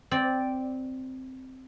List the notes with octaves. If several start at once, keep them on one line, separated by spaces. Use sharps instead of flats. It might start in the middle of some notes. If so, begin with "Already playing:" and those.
C4 D5